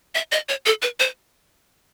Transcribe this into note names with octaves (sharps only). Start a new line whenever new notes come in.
E5
D#5
C#5
A4
B4
C5